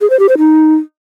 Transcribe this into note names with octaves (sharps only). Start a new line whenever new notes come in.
G#4
C5
G4
C5
D#4